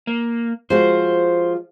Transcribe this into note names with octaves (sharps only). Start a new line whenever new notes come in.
A#3
F3 G#3 F#4 C5